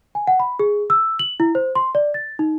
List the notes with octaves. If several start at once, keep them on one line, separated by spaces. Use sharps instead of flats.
G#5
F#5
B5
G#4
E6
F#7
E4
C5
C6
D5
A6
D#4